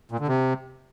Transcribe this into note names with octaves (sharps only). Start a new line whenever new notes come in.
A#2
D3
C3